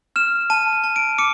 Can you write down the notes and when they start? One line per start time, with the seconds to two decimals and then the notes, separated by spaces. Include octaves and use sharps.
0.16 F6 E7
0.50 A5 D#7
0.73 D#7
0.84 A5
0.96 D7
1.18 D6 C#7